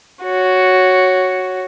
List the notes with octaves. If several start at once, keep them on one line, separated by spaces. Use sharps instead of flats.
F#4 C#5